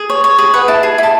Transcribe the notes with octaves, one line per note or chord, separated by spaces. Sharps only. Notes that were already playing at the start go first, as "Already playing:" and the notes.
Already playing: G#4
C#5
C#5
G#4
B4 F#5
E4 A5
G#4
E4 A5